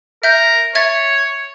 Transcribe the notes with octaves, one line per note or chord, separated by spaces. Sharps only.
A#4 E5 G6
C#5 E5 G#6 A6